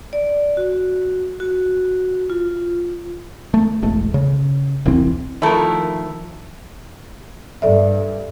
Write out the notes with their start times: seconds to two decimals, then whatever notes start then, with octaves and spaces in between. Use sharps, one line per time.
0.13 D5
0.57 F#4
1.40 F#4
2.30 F4
3.54 A3
3.82 E1 A1 G#3 A3
4.14 C#3
4.85 E1 C2 E3 C4
5.42 D#3 F3 A3 E4 A#4
7.62 G2 A4 D5 E5